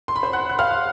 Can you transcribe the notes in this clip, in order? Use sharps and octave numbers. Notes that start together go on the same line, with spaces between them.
C6
B5
C5 C6
F#5 F#6
F#6
F5 F6